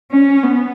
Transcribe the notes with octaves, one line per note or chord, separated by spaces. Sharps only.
C#4
B3